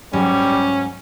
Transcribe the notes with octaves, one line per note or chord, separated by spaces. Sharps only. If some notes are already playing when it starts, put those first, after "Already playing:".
G#2 F#3 G3 C#4